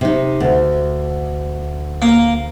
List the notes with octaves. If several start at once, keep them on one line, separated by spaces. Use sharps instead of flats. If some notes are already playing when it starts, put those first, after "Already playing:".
C3 D#4
D2
A#3